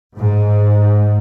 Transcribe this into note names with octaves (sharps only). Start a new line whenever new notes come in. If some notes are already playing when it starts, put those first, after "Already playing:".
G#2